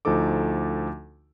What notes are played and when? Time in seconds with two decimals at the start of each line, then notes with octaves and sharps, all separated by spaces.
0.05 D2 F3 D#4 A4 D6